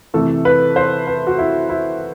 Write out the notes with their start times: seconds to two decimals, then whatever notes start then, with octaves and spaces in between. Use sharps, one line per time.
0.14 C3 E3 A3 A4
0.45 B4
0.76 C5
1.07 B4
1.27 F#4
1.38 E4
1.69 E4